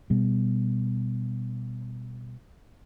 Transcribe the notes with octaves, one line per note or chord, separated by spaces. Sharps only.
B2 G3